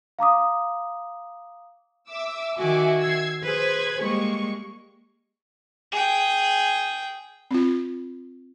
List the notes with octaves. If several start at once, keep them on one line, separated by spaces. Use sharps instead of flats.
F5 A#5 D6 D#6
E5 D6 E6
D#3 F#4 E5 G#5 D6
E6 G#6 C7
G#4 B4 C5 G#6
G3 G#3 A#3 C#6
G#4 G5
C4 F4